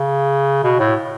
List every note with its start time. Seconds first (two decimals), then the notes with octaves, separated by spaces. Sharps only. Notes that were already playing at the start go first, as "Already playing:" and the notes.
Already playing: C#3
0.64 B2
0.79 A2